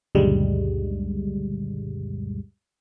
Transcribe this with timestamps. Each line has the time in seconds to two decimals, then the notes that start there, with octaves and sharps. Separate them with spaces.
0.15 C#2 F#2 A#2 D3 G3 G#3